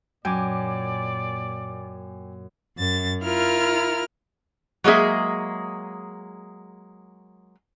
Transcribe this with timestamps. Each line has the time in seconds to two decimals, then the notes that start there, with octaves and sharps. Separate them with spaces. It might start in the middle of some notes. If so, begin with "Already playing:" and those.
0.25 F#2 A#2 D5 G5 G#5 D6
2.76 F#2 A6
3.23 E4 F4 A#4 F6
4.84 F#3 G#3 A#3 G#4 E5